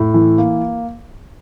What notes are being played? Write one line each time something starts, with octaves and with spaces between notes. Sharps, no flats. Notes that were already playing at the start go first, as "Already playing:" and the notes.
Already playing: A2
E3
A#3